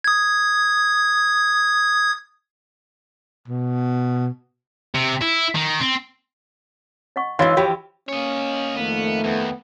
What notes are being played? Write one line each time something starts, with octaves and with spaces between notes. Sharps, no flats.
D#6 G#6
B2
C3
E4
D#3
C4
D#5 F#5 C#6
G#2 E3 F#4 C#5 D#5 F5 C6
E3 F3 F#4 G4 G5 B5
A#3 C#4 C#5 D#5
F2 D#3 A3 B3
D#2 B3